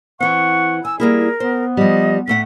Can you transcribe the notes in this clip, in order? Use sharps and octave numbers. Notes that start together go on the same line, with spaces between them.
E3 C4 F#5 C#6
G#5 E6
G3 A#3 E4 G#4 A#4
B3 C5
F3 G3 D#5
A2 A3 F#5 B6